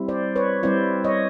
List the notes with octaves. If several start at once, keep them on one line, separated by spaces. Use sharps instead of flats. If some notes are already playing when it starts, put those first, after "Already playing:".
Already playing: G3 C4 E4
C5 D5
B4 C#5
G3 C4 E4 C5 D5
C#5 D#5